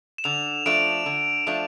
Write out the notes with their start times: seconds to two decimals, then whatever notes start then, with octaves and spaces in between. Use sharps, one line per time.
0.18 E7
0.24 D3 F7
0.66 F3 A3 D4 D7
1.06 D3
1.47 F3 A3 D4